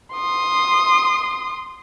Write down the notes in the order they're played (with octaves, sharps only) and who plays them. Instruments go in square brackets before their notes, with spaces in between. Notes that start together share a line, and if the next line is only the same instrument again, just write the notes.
[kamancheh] C6 D#6